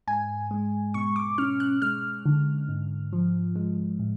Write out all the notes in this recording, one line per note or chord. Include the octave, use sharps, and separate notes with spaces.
G#2 G#5
G#3
B2 C#6
D6
C#4 F6
F#6
G#3 F6
D3
G#2
F3
G#3
A2